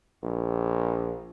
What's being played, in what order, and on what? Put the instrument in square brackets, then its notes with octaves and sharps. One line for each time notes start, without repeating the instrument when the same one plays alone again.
[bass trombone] A#1